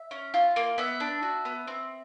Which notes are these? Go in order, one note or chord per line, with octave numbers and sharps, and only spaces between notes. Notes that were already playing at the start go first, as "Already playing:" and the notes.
Already playing: E5
C#4
F4
A#3
B3 E5
D4
F#4
B3
C4